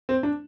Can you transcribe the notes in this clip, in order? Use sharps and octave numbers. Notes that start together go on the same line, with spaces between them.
C4
D4